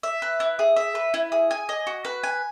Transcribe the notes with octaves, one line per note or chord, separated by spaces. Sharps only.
E5
B4
E4
G#4
E5
B4
E4
G#4
G#5
D#5
F#4
B4
G#5